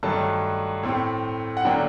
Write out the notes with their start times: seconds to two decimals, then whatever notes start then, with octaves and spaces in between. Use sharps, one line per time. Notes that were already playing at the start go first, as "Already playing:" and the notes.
0.03 G2 D#3 F#3 A3 A5
0.83 A2 A3 C4
1.57 F#5
1.65 D3 F#3 A#3 D4 G5